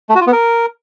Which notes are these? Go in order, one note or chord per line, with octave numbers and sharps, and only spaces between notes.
A3
F#4
F4
B3
A#4